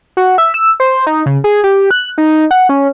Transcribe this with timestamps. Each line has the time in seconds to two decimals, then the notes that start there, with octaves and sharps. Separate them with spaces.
0.17 F#4
0.38 E5
0.54 E6
0.80 C5
1.07 D#4
1.26 C#3
1.44 G#4
1.64 G4
1.91 F#6
2.18 D#4
2.51 F#5
2.69 C#4